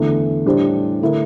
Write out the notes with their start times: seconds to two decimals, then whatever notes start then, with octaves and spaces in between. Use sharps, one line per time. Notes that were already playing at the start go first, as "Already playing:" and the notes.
Already playing: E2 D3 A3 E4
0.46 A2 G3 D4 G4 C5
1.01 D3 A3 E4 A#4